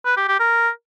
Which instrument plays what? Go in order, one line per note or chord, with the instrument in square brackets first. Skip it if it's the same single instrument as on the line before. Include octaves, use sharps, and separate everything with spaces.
[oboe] B4
G4
G4
A#4